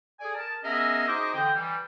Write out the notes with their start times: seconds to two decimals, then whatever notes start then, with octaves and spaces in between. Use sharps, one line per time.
0.20 G#4 A4 D5 G#5
0.35 A#4 A5
0.63 B3 C#4 G#4 A#4 D#5 E5
1.08 D#4 F#4 G#4 C5 D#5 D6
1.33 D3 E3 C4 D#5 G5
1.55 E3 G3